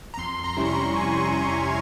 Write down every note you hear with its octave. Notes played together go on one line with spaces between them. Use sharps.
A#5
F2 C6
A#5
C3 G3 C#4 E4
C#6
C6
F2 G#5
C3 G3 C#4 E4